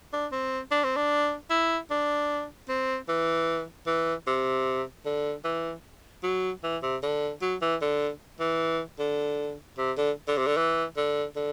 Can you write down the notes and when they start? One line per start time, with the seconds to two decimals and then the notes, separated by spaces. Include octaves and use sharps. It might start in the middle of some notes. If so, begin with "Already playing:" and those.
0.13 D4
0.32 C4
0.71 D4
0.84 C4
0.96 D4
1.50 E4
1.90 D4
2.69 C4
3.08 E3
3.87 E3
4.27 C3
5.06 D3
5.44 E3
6.23 F#3
6.63 E3
6.82 C3
7.03 D3
7.42 F#3
7.62 E3
7.82 D3
8.40 E3
8.99 D3
9.78 C3
9.97 D3
10.28 D3
10.37 C3
10.47 D3
10.57 E3
10.97 D3
11.36 D3